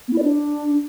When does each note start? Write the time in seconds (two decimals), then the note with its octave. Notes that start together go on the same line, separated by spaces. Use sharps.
0.08 B3
0.13 E4
0.18 D5
0.23 D4